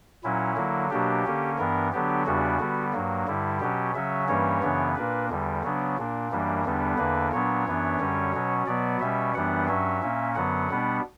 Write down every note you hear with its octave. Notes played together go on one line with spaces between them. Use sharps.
A#2 F#3 C#4 E4
D3 F#3 A#3
B2 F#3 A#3 D4 G4
D3 A#3 C#4
G2 E3 B3 D4 A#4
D3 F#3 B3 D4 G4
E2 C#3 G3 B3 D4 F#4
D3 G3 B3
G2 F#3 A#3
G2 D3 G3 E4
B2 F#3 C#4 G4
C#3 F#3 C#4 E5
G2 E3 G3 A#3 C#4 C#5
F#2 C#3 E3 B3 D4
A#2 A#3 D4 B4
E2 D3 G3
C#3 F#3 B3 D4
A#2 A#3 D4
F#2 E3 G3 A#3 D4
E2 D3 G3 B3 D4
E2 D3 A#3 D4 B4
A#2 F#3 B3 D4 C#5
F#2 E3 B3 D4
F#2 D3 G3 C#4
B2 F#3 C#4
B2 F#3 B3 D5
B2 G3 C#4 E5
F#2 E3 G3 B3 D4 F#5
G2 F#3 C#4 E5
A#2 A#3 C#4
F#2 D3 F#3 B3 F#5
B2 G3 B3 D4